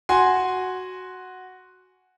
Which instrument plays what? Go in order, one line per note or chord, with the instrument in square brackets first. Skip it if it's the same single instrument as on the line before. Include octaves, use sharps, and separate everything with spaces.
[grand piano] F#4 G#5 C6